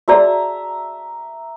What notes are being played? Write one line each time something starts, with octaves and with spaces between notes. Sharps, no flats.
F#4 G#4 D5 E5 A#5